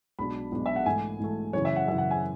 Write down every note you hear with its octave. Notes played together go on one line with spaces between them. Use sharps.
B1 B2 G#3 D4 F#4 B5
B1 B2 G#3 D4 F#4
E5
F#5
G#2 E3 A3 G#5
G#2 E3 A3
F#2 C#3 E3 C#5
E5
F#5
F#2 C#3 E3 E5
F#5
G#5